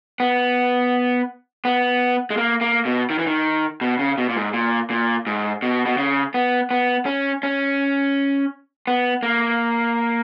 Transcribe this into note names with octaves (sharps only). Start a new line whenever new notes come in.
B3
B3
G#3
A#3
A#3
B2
D#3
E3
D#3
B2
C#3
B2
A#2
G#2
A#2
A#2
G#2
B2
B2
C#3
B3
B3
C#4
C#4
B3
A#3